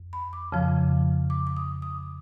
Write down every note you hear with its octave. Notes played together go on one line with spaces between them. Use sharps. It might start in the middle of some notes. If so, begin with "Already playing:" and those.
Already playing: F2
B5
D6
F2 C#3 F3
D6
D6
D#6
D#6